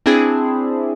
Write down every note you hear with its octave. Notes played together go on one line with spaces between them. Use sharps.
C4 D4 E4 G#4